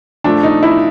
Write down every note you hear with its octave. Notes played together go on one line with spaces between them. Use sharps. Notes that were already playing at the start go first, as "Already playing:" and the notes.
A#2 F3 A3 D4
D#4
E4